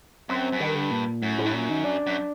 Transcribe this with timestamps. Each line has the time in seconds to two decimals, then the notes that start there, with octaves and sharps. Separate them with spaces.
0.29 F#2 C4
0.52 F#2
0.60 G2 D#3
0.75 D3
0.91 A#2
1.22 F#2 A2
1.38 A2
1.46 G2
1.53 F#2 A#2
1.69 D#3
1.84 D4
2.06 F#2